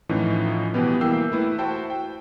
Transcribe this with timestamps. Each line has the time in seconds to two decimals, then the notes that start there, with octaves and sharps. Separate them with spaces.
0.09 A2 E3 F3 A3 C#4 D#4
0.74 B2 E3 G3 B3 G4
1.01 E3 A#3 G5 E6 G6 C7
1.32 A3 E4 B4
1.58 E4 F#4 C5 G5 A5
1.90 G5